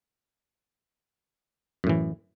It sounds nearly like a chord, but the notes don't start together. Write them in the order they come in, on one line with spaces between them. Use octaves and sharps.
F#2 A2 E3